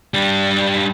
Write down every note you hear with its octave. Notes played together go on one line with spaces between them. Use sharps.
G3 D4